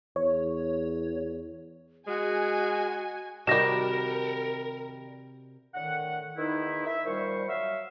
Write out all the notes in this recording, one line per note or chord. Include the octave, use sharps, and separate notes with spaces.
E2 C#5
G#3 F#4 G#5
C3 D#3 G3 F#4 A#4 A#6 E7
A2 D3 D#3 F#5
E2 D#3 D#4 E4
E5
A#2 D#3 G3 C5 C#6
F#3 E5 F5